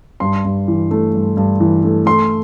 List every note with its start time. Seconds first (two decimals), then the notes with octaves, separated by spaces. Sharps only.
0.20 G2 C6
0.45 G2
0.68 E3
0.91 A3
1.14 G2
1.37 G2
1.60 E3
1.84 A3
2.06 A3 C6